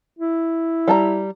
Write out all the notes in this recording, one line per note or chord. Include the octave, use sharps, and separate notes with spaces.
E4
G3 A5 A#5